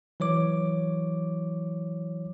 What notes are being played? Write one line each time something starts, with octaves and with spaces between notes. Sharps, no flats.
E3 F#3 C#5 D6